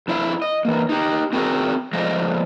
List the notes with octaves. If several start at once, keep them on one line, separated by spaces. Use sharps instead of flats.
F2 E4 E5 F5
D#5
E3 A#3
D#4 G4
C4 F#4 G#4 A#4
F3 G#3 A3 D#5 F5